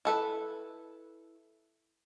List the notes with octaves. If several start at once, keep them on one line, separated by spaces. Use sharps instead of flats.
E4 A4 B4